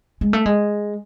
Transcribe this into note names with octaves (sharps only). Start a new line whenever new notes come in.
G#3
A3
G#3